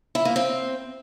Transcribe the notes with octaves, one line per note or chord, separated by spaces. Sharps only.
E4
A#3
C4